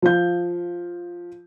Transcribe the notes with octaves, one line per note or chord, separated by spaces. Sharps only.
F3 F5 G6